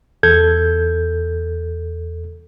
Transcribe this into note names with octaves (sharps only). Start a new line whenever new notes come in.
E2 A4 G6 G#6